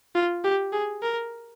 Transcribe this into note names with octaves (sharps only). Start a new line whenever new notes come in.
F4
G4
G#4
A#4